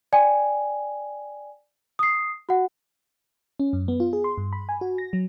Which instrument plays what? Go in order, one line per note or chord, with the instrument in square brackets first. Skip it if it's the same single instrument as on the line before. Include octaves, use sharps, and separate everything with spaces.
[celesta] D5 G5 G#5
D#6 C7
F#4 F#5
[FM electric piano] C#4
F#2
B3
F4
G#4
C6
G2
B5
G#5
F#4
A#6
F#3